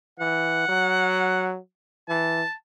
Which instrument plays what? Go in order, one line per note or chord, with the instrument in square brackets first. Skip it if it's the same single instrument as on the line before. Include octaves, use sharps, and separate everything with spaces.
[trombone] E3 [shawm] F#5
[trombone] F#3
[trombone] E3 [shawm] A5